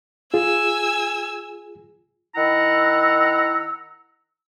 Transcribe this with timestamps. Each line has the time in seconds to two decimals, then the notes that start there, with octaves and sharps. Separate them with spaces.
0.34 F4 G#4 G#5 E6
2.35 D#3 E4 F#5 A#5 E6